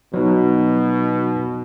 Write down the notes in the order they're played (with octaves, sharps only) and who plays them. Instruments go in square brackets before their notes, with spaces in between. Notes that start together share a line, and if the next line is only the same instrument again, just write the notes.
[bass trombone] B2 [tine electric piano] F#3 D#4